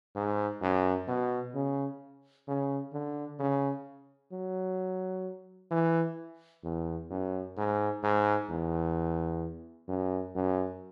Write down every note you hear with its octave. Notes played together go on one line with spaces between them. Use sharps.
G#2
F#2
B2
C#3
C#3
D3
C#3
F#3
E3
E2
F#2
G#2
G#2
E2
F#2
F#2